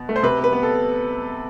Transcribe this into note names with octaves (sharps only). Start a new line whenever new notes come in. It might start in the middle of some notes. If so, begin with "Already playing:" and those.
Already playing: B2
A3
C5
C3 B4
B3
B4
B3
A4